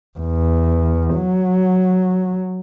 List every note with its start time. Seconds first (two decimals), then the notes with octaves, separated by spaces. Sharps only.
0.19 E2
1.14 F#3